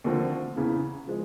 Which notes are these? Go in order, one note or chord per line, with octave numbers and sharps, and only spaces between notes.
D#2 D3 F3 A3 C4
E2 C#3 E3
F3 G#3